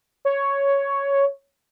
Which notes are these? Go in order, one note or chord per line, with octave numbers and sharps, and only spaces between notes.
C#5